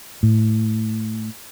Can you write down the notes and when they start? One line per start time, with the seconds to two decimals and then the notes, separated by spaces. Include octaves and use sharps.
0.23 A2